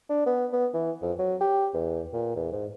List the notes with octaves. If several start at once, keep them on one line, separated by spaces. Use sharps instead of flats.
D4
B3
B3
E3
F2
F#3
G4
E2
A#2
E2
G#2